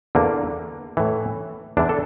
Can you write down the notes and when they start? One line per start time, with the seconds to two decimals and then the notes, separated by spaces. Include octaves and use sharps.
0.15 E2 D3 A#3
0.97 A2 E3
1.77 E2 E3 D4
1.89 A4